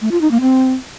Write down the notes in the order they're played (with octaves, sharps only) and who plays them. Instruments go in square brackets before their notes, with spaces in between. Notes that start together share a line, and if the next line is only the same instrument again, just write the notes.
[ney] A3
F4
D#4
A#3
C4